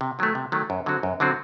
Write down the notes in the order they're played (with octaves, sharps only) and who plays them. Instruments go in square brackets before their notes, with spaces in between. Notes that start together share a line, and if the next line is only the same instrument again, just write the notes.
[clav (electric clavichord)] C3
D#3 F#3 A3
C3
D#3 F#3 A3
F#2
D3 F#3 C4 F#4
F#2
D3 F#3 C4 F#4